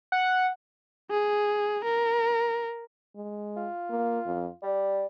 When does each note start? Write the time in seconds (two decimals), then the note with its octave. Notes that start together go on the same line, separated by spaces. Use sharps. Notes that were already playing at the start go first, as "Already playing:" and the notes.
0.12 F#5
1.10 G#4
1.85 A#4
3.16 G#3
3.56 F4
3.90 A#3
4.26 F2
4.63 G3 D5